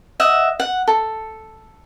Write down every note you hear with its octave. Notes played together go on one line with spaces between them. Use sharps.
D#5 E5 F#5
F#5
A4